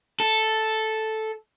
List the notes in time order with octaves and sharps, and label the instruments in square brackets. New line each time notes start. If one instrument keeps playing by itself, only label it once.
[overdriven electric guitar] A4